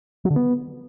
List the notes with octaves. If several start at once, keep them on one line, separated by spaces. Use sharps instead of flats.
F#3
D3
B3